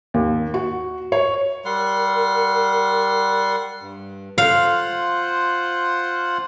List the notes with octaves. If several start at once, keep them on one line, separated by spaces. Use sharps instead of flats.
D#2
F#4
C#5
G3 A#4 F#5 C6
G2
F4 C5 F5 F#5